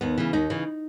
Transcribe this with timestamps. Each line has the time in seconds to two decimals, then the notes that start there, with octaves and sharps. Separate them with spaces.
0.01 D#2 B3
0.18 C#3 E3
0.33 D#2 D#4
0.50 C#3 E3